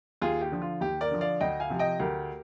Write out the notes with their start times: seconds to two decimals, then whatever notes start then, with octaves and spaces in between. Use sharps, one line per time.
0.22 D#2 F4 G#4
0.41 G4
0.52 D3 F3
0.62 F4
0.81 D#2 G4
1.01 A#4 D5
1.11 D3 F3
1.21 D5 F5
1.41 D2 D#5 G5
1.60 F5 G#5
1.70 C3 F3
1.79 D#5 G5
2.00 D2 G4 A#4